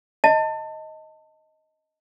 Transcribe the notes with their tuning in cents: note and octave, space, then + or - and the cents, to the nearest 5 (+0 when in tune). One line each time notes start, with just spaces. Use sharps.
D#5 +10 A5 +25